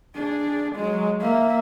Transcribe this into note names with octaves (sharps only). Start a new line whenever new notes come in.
D4 G#4
F#3 G#3
A#3 E5